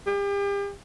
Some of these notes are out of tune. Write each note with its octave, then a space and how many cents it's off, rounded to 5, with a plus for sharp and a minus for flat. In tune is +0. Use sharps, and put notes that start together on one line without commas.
G4 +40